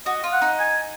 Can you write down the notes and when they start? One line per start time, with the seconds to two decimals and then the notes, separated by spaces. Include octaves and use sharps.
0.06 F#4 D#5
0.24 F4
0.32 F#5
0.42 D#4
0.59 G#5